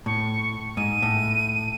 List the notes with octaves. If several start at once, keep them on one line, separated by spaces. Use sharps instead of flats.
A2 C#6
G#2 D#7
A2